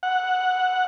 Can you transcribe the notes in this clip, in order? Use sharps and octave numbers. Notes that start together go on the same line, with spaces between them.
F#5